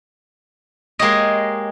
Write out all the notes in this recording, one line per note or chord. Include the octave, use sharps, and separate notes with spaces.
G#3 A#3 G4 C#5 D#5